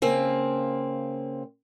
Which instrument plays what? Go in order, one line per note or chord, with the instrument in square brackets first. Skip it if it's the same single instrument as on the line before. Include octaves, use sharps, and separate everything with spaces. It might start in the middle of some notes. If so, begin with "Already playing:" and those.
[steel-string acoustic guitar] C#3 A#3 C4